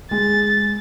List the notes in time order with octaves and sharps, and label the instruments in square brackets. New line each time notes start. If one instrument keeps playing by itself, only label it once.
[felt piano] G#3 [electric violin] A6